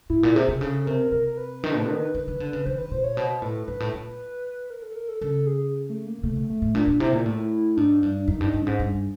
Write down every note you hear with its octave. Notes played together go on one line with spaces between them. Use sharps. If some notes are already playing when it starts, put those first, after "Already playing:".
G#2 E4
A#2
C3 G#4
C3
C#3 A4
C3 A#4
C3 A#4
A#4
B4
D#3
A2
D#3
D#3
D#3
D3
C#3
D#3 C5
B4
A#2 C5
C#5
B2 C5
A2 B4
G#2 B4
A2
A#2
A#4
A4
A#4
A4
C#3 A4
G#4
A3
A#3
C3 A3
B2
A3
A2
A#2 D4
A#2
C3 E4
A#2
A2
G#2 D4
G2 D4
F#2 D#4
G2
D#4
G2
G#2 C#4
G2